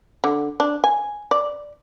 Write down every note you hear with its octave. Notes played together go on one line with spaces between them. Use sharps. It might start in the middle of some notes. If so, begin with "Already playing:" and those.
D3
D4
G#5
D5